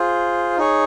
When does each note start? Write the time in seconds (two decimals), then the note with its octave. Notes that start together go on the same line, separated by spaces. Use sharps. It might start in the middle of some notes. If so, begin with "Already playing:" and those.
Already playing: F4 G#4 C5
0.57 D#4 G#4 C#5